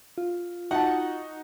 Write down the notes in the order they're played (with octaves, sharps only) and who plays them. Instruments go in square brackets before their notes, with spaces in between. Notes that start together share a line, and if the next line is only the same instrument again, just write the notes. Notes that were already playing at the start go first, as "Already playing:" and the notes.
[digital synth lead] F4
[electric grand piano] D#4 F#4 [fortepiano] F#5 A5